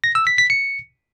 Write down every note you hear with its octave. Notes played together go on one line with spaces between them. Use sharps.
A#6
E6
B6
B6
C#7